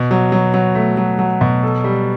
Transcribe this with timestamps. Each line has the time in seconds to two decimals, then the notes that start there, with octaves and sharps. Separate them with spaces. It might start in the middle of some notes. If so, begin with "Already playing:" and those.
Already playing: B2
0.11 F#3
0.32 F#3
0.54 F#3
0.75 A3
0.97 F#3
1.19 F#3
1.41 B2
1.63 A4
1.84 G3